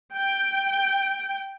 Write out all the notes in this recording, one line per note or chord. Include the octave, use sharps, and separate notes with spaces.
G5